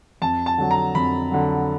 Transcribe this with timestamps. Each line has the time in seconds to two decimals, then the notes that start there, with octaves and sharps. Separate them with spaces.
0.22 F2 A5
0.46 A5
0.58 D3 F#3
0.71 A#5
0.95 F2 B5
1.31 D3 F#3